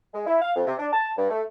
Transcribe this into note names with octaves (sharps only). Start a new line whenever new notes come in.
G#3
E4
F5
F2
C3
D4
A5
G2
A3